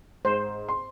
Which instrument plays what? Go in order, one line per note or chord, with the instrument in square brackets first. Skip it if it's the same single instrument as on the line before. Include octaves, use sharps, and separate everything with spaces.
[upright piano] G#2 [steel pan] C5
[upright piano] C6